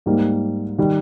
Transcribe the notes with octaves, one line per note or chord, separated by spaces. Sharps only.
G#2 G3 A#3
D#3 G3